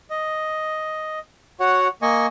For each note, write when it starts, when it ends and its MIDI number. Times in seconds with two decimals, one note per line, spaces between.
0.10 1.19 75
1.60 1.88 66
1.60 1.88 73
1.60 1.88 78
2.02 2.27 58
2.02 2.27 75
2.02 2.27 80
2.02 2.27 85